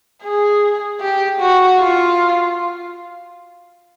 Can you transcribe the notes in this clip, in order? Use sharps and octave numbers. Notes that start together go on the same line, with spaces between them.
G#4
G4
F#4
F4